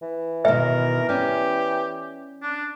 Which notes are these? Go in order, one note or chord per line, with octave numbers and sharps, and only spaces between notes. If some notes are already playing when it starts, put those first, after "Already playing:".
E3
B2 D#3 A#4 E5
C#4 G4 D5
D4